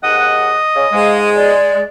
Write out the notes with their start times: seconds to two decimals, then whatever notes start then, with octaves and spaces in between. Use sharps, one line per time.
0.03 D#2 G#2 D#5 F#5 D#6
0.76 C#3
0.93 G#2 G#3 F5
1.35 D5